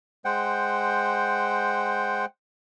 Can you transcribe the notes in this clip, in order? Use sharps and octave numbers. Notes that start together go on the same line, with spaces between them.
G#3 C5 F#5 G5